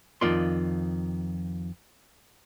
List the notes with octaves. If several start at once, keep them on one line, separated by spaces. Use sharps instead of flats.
F2 D#3 F4 D5 C6